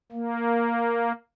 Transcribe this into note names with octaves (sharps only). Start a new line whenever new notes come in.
A#3